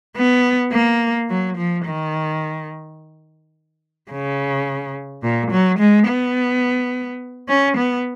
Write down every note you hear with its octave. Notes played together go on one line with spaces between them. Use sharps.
B3
A#3
F#3
F3
D#3
C#3
A#2
F#3
G#3
B3
C#4
B3